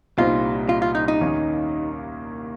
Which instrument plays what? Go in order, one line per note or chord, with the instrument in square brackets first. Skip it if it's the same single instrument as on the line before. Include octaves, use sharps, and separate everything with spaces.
[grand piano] C2 A#2 G3 C4 D#4 [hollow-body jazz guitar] F4
[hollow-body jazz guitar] F4
F4
D#4
D#4
[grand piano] D#2 D#3 A#3 C#4